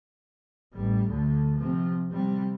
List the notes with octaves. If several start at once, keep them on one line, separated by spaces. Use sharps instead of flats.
A1 G3
D2 D3
C3 F3
C3 G3